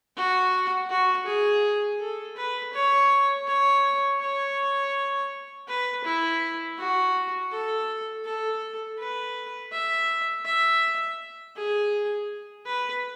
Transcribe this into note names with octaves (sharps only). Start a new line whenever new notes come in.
F#4
F#4
G#4
A4
B4
C#5
C#5
C#5
B4
E4
F#4
A4
A4
B4
E5
E5
G#4
B4